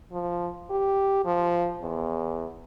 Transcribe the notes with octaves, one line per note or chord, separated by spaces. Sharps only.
F3
G4
F3
E2